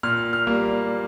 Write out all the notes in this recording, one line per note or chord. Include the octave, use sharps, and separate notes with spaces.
A#2 F6
F6
G3 A#3